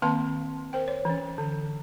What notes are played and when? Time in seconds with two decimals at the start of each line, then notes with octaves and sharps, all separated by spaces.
0.02 D#3 A#3 C4 B4 A5 C6
0.73 A#4 C5 G5
0.88 C#5
1.05 E3 C#4
1.38 D3